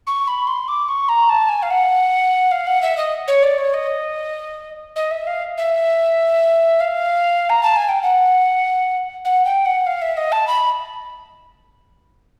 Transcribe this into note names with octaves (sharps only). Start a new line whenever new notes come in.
C#6
B5
C6
D6
C#6
A#5
A5
G#5
F5
F#5
F5
F#5
E5
D#5
C#5
D5
C#5
D#5
D#5
E5
F5
E5
F5
A#5
A5
G#5
G5
F#5
F#5
G5
F#5
F5
E5
D#5
A5
B5